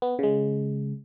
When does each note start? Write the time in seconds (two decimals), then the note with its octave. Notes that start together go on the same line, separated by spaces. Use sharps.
0.02 B3
0.19 C#3 G#3